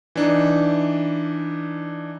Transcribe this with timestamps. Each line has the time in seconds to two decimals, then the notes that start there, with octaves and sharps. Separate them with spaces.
0.16 E3 D4 D#4